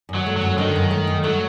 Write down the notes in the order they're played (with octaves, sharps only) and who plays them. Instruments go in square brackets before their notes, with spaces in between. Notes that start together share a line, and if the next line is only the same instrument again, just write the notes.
[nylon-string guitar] F#2
[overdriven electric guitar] F#3
[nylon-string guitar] A3
[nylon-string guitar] F#2 [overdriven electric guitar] F#3
[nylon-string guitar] D3 [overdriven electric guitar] D#3
[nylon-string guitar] F#2
A3
F#2
[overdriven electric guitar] F#3 [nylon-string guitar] A3